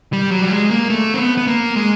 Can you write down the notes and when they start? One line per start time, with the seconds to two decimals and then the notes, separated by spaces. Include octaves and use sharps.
0.13 G3
0.31 F#3
0.42 G3
0.51 G#3
0.70 A#3
0.90 A3
1.14 C4
1.18 B3
1.37 B3
1.47 A#3
1.76 G#3